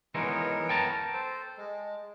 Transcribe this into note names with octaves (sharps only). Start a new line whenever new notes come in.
E3 G#3 B3 D#4 A#4 C#5
G5 A5 A#5
A4 C5
G#3